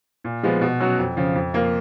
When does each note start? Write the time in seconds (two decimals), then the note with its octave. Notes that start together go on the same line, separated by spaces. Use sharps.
0.24 A#2
0.43 F3 G#3 B3
0.61 B2
0.80 F#3 C#4 F#4
0.99 F2
1.17 C#3 F3
1.35 F2
1.53 F3 A#3 F4 A#4